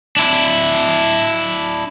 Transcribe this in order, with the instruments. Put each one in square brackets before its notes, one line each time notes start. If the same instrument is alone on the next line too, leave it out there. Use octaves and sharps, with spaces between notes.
[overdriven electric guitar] D4 E4